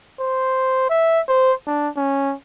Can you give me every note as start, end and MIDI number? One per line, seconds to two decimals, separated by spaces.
0.20 0.86 72
0.89 1.20 76
1.28 1.52 72
1.67 1.88 62
1.97 2.34 61